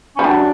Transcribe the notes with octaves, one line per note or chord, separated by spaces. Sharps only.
C#4
G3
F#3 D4